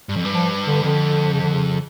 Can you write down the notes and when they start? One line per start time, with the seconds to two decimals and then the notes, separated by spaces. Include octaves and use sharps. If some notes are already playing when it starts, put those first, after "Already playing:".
0.09 G2
0.17 F2
0.25 G2
0.33 F3
0.66 D3
0.83 F2 D3
1.33 C#3
1.42 D3
1.53 C#3